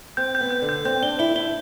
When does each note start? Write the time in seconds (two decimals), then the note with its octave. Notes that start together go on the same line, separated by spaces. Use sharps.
0.17 C4 G6
0.35 G6
0.40 B3
0.51 G6
0.62 D3
0.69 G6
0.85 C4 G6
1.02 D4 G7
1.19 E4 G7
1.36 E4 G7